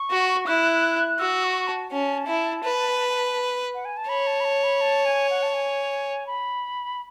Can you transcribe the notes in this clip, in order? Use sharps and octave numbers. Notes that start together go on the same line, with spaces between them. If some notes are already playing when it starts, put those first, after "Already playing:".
Already playing: C#6
F#4
E4 F#6
F#4 E6
C#6
A5
C#4 A5
E4
B4
F#5
G#5
A5
C#5 B5
A5
B5
A5
B5
A5
G#5
F#5
A5
G#5
B5